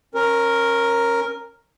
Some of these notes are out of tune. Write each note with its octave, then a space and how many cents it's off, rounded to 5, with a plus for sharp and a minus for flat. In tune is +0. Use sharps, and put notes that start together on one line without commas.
C#4 -25 A#4 +0